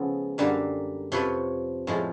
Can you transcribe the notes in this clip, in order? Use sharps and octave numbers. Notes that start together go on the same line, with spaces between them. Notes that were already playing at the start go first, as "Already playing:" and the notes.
Already playing: C#3 F3 G#3 B3 A4
F#2 D3 G3 A#3
F2 C3 F3 B4 C#5
A2 F3 G#3